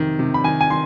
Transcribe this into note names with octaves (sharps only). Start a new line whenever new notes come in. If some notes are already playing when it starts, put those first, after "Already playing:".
Already playing: F2 C3 D#3
C3
B5
D#3 G#5
G#5
D#3 C6